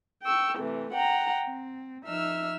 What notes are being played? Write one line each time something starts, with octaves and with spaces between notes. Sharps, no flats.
G5 C#6 E6
C3 E3 A3
F#5 G5 A#5
C4
F3 D#4 E5 E6 F6